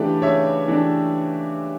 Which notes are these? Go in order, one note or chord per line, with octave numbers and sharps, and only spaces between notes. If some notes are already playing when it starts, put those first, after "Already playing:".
Already playing: C#3 E3 A3 D4 G4 B4 D5
C#3 C#5 E5
E3 A3 D4